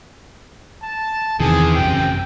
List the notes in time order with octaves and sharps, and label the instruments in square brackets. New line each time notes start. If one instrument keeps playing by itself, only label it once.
[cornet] A5
[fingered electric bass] E2 D#3 E3 [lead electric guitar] C3 [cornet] G#4
[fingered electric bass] A1 F#2 C#3 [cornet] G5